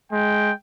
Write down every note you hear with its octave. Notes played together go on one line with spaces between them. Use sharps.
G#3 G5